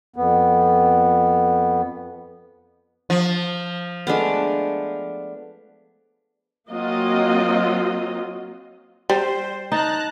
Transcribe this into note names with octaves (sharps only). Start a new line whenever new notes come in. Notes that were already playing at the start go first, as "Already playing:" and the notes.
F2 B3
F3
G#3 A3 B3 D4 F5
F#3 A#3 C4 F4 D#5
G3 C5
D#4 A5 A#5 F#6